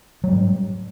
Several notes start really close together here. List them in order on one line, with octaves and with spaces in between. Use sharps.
F#3 G3 G#2